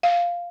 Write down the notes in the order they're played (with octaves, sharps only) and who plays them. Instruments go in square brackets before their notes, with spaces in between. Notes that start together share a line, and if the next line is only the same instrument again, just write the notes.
[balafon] F5